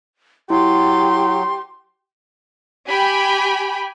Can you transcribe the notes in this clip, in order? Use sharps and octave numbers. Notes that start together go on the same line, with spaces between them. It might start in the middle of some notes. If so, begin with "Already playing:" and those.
F#3 E4 G4 C6
G4 G5 G#5 B5